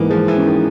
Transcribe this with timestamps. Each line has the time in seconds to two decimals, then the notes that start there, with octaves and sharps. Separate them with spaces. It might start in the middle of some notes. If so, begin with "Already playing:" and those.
Already playing: G#2 E3 A#3 B3
0.10 F3 G#3
0.28 E3
0.37 C#4
0.46 D#3